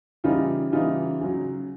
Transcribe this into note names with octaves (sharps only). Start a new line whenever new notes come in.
C#3 E3 G3 D#4 F4
C#3 E3 G3 D#4 F4
C#3 F#3